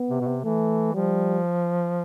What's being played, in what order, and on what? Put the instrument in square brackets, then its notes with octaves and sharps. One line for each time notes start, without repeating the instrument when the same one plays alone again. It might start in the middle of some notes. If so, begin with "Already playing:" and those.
Already playing: [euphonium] B3
[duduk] C3
B2
C3
[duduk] E3 [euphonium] A3
[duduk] F3 [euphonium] G3